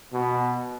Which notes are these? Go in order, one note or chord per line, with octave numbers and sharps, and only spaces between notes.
B2